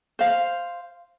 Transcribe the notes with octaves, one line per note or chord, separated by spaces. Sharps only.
C5 F5